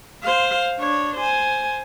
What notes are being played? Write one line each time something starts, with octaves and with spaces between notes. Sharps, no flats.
C5 F5
D4 C#5
C5 G#5